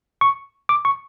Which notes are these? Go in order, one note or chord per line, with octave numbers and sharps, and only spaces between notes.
C#6
D6
C#6